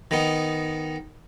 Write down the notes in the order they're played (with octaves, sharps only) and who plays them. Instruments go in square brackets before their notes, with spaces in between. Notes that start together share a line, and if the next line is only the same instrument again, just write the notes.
[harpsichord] D#3 B3 D#4